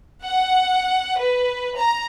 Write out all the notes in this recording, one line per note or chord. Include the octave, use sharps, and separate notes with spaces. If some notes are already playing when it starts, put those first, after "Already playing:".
F#5
B4
A#5